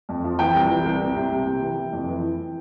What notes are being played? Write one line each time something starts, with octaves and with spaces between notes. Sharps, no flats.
F2
F3
E3 G5
C2
E3
C2
C2
C3
C2
C3
E3
E3
F2
E3
E3